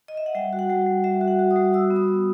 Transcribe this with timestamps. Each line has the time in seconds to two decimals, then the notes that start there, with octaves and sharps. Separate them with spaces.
0.08 D#5
0.17 E5
0.26 F#5
0.35 G3 G5
0.53 F#4
0.59 F#5
0.70 G3 G5
0.87 G3
1.04 G3 E5
1.21 F#4
1.28 F#5
1.39 F#4
1.51 D#6
1.56 G3
1.73 F#4 E6
1.90 B3
1.96 D#6
2.08 B3